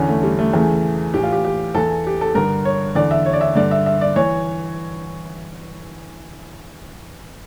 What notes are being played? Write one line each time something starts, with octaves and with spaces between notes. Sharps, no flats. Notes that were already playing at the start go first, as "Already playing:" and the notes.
Already playing: E2 D3 C#4
A3
G3
A3
E2 C#3 E3
A2 E3 G4
F4
G4
G4
E2 E3 A4
G4
A4
G2 D3 A#4
C#5
E2 D3 D5
E5
C#5
D5
E5
G2 D3 D5
E5
E5
D5
E3 C#5